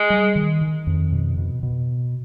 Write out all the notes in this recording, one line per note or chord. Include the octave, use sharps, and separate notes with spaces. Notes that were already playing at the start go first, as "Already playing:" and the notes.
Already playing: G#3
G3
D#3
D#3
F2
B2
B2
B2